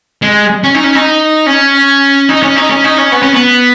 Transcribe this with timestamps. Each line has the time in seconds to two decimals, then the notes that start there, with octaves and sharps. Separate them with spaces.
0.22 G#3
0.64 C#4
0.74 D#4
0.84 C#4
0.95 D#4
1.46 C#4
2.29 D#4
2.43 C#4
2.56 D#4
2.70 C#4
2.84 D#4
2.98 C#4
3.12 B3
3.22 C#4
3.34 B3